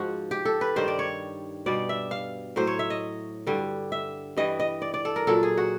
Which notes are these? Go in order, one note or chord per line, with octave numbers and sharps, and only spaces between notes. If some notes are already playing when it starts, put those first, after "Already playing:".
Already playing: G#2 F3 F#4
G4
A4
B4
G2 D#3 G3 C5
D5
C#5
B2 G3 D5
E5
F5
A2 F#3 C5
C#5
E5
D#5
G2 D3 G3
E5
G2 E3 G3 D#5
D#5
D5
D5
A4
A#4
A#2 F#3 A4
G#4
F#4